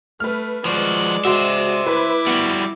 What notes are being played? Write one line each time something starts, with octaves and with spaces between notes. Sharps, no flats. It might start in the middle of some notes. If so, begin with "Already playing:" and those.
A3 B4 F6
F3 G#3 F#4 D5
F#4 C5 E5
E4 B4 D6
G3 B3 F#4